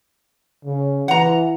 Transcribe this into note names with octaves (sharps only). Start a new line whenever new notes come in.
C#3
E3 F#5 A#5